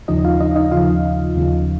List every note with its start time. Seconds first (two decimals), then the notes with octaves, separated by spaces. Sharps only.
0.08 D#2 C#3 F3 D#4 D#5
0.25 F4 F5
0.41 D#4 D#5
0.56 D#4 D#5
0.71 D#2 C#3 F3 F4 F5
1.36 D#2 C#3 F3